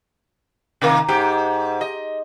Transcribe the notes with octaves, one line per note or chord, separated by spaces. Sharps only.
C3 D#3 A#3
G#2 G4
D#5